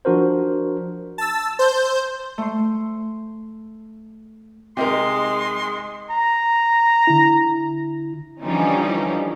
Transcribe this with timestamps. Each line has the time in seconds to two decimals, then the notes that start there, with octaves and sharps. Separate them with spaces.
0.05 F3 D4 F#4 A#4 C5
1.18 A5 E6
1.59 C5 G6
2.38 A3 C6
4.77 C3 G#3 D#4 A#4 C6
6.11 A#5
7.07 D3 E4
8.42 D3 E3 F3 G3 C#4 D#4